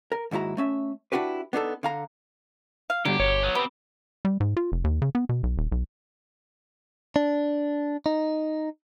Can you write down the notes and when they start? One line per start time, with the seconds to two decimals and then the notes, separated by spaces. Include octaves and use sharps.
0.12 A#4
0.31 D#2 G#2 E4 F#4 A#5
0.57 A3 C#4 E5
1.12 D4 E4 F#4 G4 B4
1.53 B3 D4 D#4 A4
1.83 D3 F5 A#5
2.90 F5
3.05 G2 D3 F#3 G4
3.20 G1 C#5
3.43 F#3 B3
3.55 B3 C4 G4
4.25 G3
4.40 G#2
4.57 F4
4.72 F1
4.84 D#2
5.02 C#3
5.15 B3
5.29 B2
5.43 B1
5.57 D#1
5.72 B1
7.16 D4
8.06 D#4